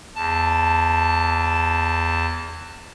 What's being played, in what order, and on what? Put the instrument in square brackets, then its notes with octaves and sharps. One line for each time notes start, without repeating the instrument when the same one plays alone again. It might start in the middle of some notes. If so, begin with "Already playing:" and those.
[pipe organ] E2 A5